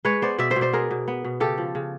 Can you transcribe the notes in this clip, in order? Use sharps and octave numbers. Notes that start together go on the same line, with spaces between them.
G#3 B4 C#5
B3 C5 D5
B2 D5 E5
C5 D5
B2
C5 D5
B3 G#4 A#4
B2
B3
B2
C#3 G4 A4
F3
C#3